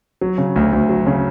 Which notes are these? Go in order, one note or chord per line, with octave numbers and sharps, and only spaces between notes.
F#3
C#3
D2
D2
F#3
C#3